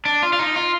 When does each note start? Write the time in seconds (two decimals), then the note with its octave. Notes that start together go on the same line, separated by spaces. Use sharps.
0.05 D4
0.23 F4
0.33 F4
0.39 D#4
0.56 F4